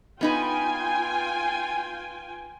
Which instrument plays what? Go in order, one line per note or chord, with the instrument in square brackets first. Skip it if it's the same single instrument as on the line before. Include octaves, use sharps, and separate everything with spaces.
[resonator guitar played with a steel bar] B3 D#4 B4 [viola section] F4 G5 G#5